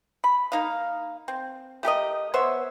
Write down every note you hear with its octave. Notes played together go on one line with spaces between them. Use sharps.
B5
A#3 D#4 F5
C4
A3 G4 A#4 D#5
B3 C5 C#5 E5